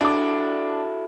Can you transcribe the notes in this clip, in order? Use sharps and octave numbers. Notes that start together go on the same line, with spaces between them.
D4 E4 F#4 A4 D6